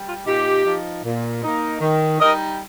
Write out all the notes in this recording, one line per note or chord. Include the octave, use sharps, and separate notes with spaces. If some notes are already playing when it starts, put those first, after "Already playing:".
Already playing: G3
F4
A#2 D#4 G4
F3 D#4
A#2
A#3 D#4
D#3
G3 D#4 A#4 D#5